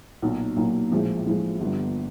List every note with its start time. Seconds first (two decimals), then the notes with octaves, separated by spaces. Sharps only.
0.22 B1 A#2 F#3 A#3 D#4
0.57 B1 A#2 F#3 A#3 D#4
0.91 A#1 A2 F3 G#3
1.26 A#1 A2 F3 G#3
1.60 G1 G2 D3 G3 B3